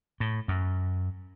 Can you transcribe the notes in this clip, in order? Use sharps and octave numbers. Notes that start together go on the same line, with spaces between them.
A2
F#2